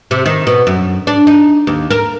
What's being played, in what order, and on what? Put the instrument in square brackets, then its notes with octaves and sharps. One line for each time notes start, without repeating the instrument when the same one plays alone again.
[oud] C3
D#3
B2
F#2
D4
D#4
D#2
A#4